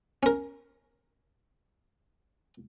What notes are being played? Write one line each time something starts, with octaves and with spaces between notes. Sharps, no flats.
C#4 A#4